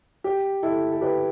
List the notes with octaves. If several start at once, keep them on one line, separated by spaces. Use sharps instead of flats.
G4
E4 A4
A4
G4 B4